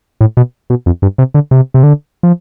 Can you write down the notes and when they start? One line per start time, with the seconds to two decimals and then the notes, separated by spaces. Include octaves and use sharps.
0.21 A2
0.37 B2
0.70 B2
0.86 F2
1.02 G2
1.18 C3
1.34 D3
1.51 C3
1.74 C3
1.83 D3
2.23 F3